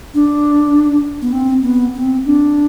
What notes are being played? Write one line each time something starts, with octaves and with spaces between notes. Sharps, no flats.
D4
B3
C4
B3
C4
D4